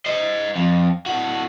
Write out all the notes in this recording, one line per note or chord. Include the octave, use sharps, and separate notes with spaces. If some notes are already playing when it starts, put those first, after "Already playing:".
C5 D#5
F2
A2 F#4